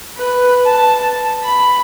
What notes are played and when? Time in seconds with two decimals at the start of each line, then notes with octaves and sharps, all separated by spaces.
0.17 B4
0.66 A5
1.44 B5